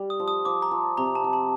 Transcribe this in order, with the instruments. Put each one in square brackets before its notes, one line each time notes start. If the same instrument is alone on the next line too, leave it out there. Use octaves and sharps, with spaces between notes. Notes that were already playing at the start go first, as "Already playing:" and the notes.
Already playing: [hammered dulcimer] G3
[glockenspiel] D#6
[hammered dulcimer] F3
[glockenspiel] D#6
[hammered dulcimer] F3 [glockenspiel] D6
[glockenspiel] A#5
[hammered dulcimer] F3
[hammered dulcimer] C3 [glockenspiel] A#5
[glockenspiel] A5
[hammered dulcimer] F3
[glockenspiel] A5